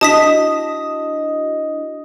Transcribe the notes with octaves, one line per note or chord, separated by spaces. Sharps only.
D4 E4 F#4 D#5 A5 D#6 B6